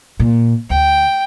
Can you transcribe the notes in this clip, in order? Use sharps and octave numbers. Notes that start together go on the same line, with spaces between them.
A#2
D2 G5